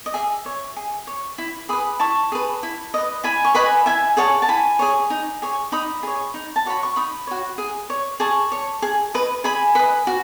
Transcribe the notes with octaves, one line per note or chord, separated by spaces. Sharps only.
D#5
G#4 E5
C#5
G#4
C#5
E4
G#4 B4 B5 D#6
E4 A5 C#6
G#4 B4
E4
B4 D#5
E4 G#5 B5
C#6
B4 D#5 G#5 B5
E4 E5 G#5
G#4 C#5 F#5 A5
A5
E4 G#5 B5
G#4 C#5
D#4
G#4 C#5
D#4 B5 D#6
G#4 C#5
D#4
A5
F#4 C#5 B5
C#6
D#4 B5 D#6
F#4 C#5
G#4
C#5
G#4 A5 C#6
C#5
G#4
B4 D#5
G#4 G#5 B5
B4 D#5
F#4